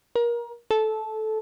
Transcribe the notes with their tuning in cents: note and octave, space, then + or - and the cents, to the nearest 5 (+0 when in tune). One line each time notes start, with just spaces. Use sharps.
A#4 +25
A4 -15